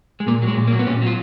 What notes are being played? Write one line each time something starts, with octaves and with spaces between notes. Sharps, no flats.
G#3
A#2 A#3
F#3
G#3
A#2
A#3
F#3
B3
A#2 C#4
F#3 F4